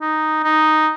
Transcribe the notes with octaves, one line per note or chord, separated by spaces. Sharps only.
D#4
D#4